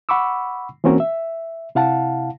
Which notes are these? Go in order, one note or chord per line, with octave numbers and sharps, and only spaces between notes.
F#5 B5 C#6 D6 E6
E3 A#3 C4 C#4 F#4 A#4
E5
C3 E4 F5 F#5 A5